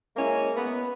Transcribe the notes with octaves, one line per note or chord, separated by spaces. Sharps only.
G#3 A#3 C#4 E4
B3